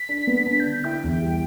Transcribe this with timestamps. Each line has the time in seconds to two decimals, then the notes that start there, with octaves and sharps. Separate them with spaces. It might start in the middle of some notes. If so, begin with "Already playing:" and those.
Already playing: B6
0.09 D4
0.27 B3
0.47 D4 B6
0.60 G6
0.66 D3
0.71 G6
0.84 E4 G5
1.04 E2
1.22 G3